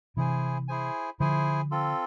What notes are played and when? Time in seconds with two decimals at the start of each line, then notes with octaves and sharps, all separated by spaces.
0.17 C3 E3 E4 G#4 C5 G#5
0.68 E4 G#4 C5 G#5
1.20 D3 F3 E4 G#4 C5 G#5
1.71 C4 F4 A4